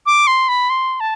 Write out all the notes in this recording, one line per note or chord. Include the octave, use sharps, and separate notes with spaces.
D6
C6
B5
C6
A5